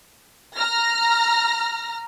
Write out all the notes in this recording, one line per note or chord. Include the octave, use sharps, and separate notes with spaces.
A#5 F6 A#6